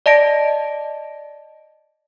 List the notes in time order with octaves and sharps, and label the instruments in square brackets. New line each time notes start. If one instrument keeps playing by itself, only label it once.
[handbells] D5 D#5 A5 A#6 D7